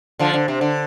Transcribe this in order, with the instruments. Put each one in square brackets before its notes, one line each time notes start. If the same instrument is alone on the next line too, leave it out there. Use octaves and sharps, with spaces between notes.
[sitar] D3 F3
D3
C3
D3